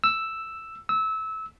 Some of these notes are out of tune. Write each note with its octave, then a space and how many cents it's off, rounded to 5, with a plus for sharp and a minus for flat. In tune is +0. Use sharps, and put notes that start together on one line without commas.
E6 +5
E6 -20